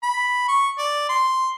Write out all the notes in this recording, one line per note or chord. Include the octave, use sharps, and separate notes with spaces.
B5
C#6
D5
C6